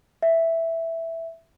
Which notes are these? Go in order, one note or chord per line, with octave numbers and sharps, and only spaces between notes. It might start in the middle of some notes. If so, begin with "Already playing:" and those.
E5